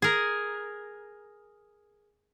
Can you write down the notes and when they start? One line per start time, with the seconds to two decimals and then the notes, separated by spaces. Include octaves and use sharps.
0.02 G#4 A#4